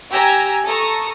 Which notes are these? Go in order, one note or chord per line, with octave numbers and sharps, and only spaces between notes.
G4 G#5 A#5 E6 G#6
A4 A5 A#5 C#6 D#6